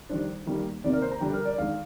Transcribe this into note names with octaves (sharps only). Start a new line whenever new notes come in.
D#3 G3 D4 C5
D#3 G3 A#3
C3 D#3 A#3 D5
A#4
C5
A#5
D3 G3 D4 G5
A#4
D5
D#3 G#3 D4 F5